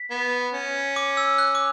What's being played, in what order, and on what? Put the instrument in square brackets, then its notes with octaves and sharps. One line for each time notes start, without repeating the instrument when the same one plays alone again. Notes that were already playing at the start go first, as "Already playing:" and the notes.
Already playing: [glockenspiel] B6
[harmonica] B3
C#4
[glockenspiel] D6
E6
F#6
D6